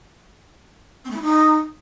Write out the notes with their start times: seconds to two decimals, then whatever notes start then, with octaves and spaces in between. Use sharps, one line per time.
1.05 C4
1.10 A3
1.16 E4
1.22 D#4